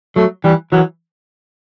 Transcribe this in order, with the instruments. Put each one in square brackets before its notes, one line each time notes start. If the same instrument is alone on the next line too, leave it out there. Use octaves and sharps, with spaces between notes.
[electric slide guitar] F#3 [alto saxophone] A3
[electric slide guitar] E3 [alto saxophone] G3
[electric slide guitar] E3 [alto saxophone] F#3